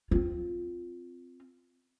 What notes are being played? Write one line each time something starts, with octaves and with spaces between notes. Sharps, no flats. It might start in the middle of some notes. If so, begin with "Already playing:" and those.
C4 F4